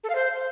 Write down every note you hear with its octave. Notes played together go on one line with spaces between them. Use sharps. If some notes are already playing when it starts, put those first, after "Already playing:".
A4
F5
C5